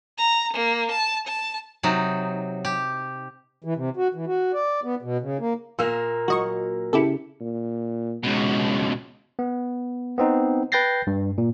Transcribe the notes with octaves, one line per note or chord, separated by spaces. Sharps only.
A#5
A#3
A5
A5
C3 F#3 D#4
G4
E3
C3
F#4
E3
F#4
D5
B3
B2
C#3
A#3
A#2 A#3 E6
F#3 F#4 D#5 C#6
C#3 E4 G4 A4 C#7
A#2
C#2 B2 G#3
B3
B3 C4 D#4
B4 G5 G6 A6 A#6 C7
G2
A#2